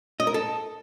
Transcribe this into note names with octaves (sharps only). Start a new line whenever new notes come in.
D#5
A#4
A4